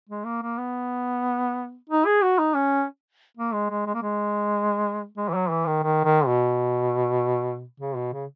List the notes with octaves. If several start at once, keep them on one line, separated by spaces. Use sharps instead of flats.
G#3
A#3
A#3
B3
D#4
G#4
F#4
D#4
C#4
A#3
G#3
G#3
G#3
A#3
G#3
G#3
E3
F#3
E3
D#3
D#3
D#3
B2
C#3
B2
C#3